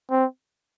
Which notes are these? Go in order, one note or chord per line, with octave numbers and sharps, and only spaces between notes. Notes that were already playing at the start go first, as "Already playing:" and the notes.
C4